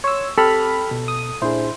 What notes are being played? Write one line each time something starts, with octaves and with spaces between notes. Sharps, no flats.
C#5 C6 E6
C4 G4 A4 B5 F6
B2
D#6
A#2 D4 E4 G#4 C5